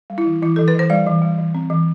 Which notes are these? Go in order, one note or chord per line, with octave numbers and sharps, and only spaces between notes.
G3
E4
E3
E3 E4
E3 A4
B4
E3 C5
G3 D5
E3
G3
E3
C4
E3